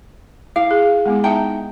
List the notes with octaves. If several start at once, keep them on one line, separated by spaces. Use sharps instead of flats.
E4 F5
G#4
G#3 B3 E4
D#4 E5 G5 A5 A#5